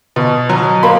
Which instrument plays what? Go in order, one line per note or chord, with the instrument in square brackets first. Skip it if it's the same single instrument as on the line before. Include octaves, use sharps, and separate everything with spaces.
[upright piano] B2
F#3
A#3 B5